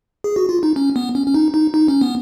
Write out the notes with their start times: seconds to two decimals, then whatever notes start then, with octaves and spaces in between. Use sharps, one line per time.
0.24 G#4
0.36 F#4
0.49 F4
0.63 D#4
0.76 C#4
0.96 B3
1.15 C#4
1.26 C#4
1.34 D#4
1.54 D#4
1.74 D#4
1.88 C#4
2.01 B3